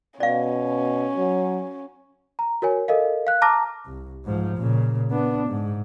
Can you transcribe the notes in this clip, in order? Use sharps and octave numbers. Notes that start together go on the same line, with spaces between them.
B2 C#4 D5 F5
F#3
A#5
F#4 A#4 C#5 G#5
A4 A#4 D#5 F5
F5 F#6
A5 A#5 D6 F6 A#6
C2
G#2 F3
A#2 C#3
B3 D4
G#2